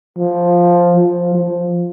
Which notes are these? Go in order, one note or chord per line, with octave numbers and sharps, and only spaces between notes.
F3
F3
F3